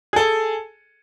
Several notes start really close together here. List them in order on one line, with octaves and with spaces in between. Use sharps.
G#4 A4 G#5